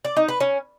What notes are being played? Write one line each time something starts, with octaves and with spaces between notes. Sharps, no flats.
D5
D#4
B4
C#4